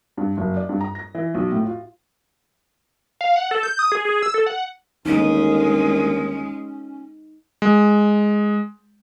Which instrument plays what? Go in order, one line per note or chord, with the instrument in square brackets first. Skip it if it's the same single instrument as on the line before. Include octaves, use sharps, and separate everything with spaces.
[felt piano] G2
F#1
D5
G2
A#5
A#6
E3
B1
A2
F4
[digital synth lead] F5
F#5
A4
G6
D#6
G#4
G#4
E6
A4
F#5
[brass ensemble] G1 D#2 [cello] G#3 [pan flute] C#4 [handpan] D#4
[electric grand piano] G#3